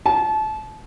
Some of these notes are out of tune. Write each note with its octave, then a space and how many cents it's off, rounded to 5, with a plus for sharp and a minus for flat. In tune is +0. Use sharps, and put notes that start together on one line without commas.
A5 -30